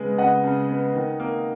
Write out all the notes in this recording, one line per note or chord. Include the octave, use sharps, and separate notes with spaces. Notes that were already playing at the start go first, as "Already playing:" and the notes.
Already playing: C#3 G#3 B3 D#5
C#3 D#5 F#5
C#3
B3
D#3
A#3